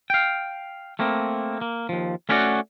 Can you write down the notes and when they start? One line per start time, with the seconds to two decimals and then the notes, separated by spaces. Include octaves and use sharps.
0.10 F5 G5
0.99 A3 A#3 C4
1.61 A#3
1.89 D#2 F3
2.29 A3 C#4 E4 F#4 D5 F#5